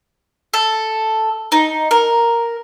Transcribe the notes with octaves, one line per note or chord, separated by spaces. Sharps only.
A4
D#4
A#4